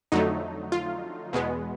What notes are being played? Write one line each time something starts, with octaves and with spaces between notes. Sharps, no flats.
F2 D3 F#3 A3 D#4
F4
E2 B2 G#3 B3